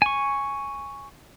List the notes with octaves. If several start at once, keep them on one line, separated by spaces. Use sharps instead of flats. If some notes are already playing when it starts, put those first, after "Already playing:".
G#5 C#6